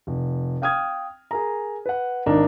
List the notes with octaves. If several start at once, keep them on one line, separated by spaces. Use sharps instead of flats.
F1
F5 G5 D#6 F6 G#6
G#4 A#4 A#5
B4 F#5
G#1 D4 D#4 A#4